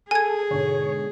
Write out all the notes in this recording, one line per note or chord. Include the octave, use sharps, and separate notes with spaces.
G#4 A4 G#5 G#6
G#2 B2 D3 C#5